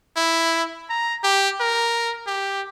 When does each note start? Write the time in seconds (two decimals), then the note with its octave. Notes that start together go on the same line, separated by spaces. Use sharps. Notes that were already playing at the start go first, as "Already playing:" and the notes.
0.17 E4
0.90 A#5
1.24 G4
1.60 A#4
2.27 G4